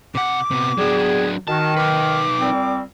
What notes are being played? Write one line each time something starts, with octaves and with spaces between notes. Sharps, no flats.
C3 F#5 D6
C3 B3
F#3 G3 B3 D4 G#4
D#3 F#4 A5
D#4 B4 D6
A#2 G3 C4